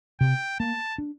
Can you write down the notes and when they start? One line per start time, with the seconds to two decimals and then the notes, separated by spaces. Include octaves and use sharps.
0.20 C3 G5
0.60 A#3 A5
0.98 D4